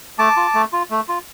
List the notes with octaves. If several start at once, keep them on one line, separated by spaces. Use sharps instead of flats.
A3 A5 D6
F4
A3
F4
A3
F4